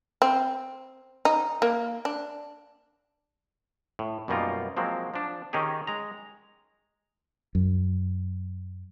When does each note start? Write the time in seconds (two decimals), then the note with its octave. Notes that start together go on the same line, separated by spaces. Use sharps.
0.22 C4
1.25 D#4
1.62 A#3
2.05 D4
3.99 A2
4.28 F#2 B2 G3 A#3 D#4 F4
4.77 F3 F#3 G#3 A#3 C4
5.14 F3 D4
5.53 D#3 C#4 D#4 G4 G#4
5.87 G#3 A#5
7.55 F#2